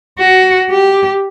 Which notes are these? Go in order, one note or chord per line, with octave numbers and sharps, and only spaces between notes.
F#4
G4